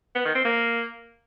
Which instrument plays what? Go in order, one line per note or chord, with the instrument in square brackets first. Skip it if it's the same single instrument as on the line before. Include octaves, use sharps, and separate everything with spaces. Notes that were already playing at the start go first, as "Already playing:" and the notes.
[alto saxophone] B3
D#3
C4
A#3